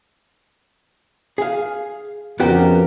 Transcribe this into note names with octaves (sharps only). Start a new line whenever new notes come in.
G#4 F5
F2 C#3 B3 F#4 G4 A#4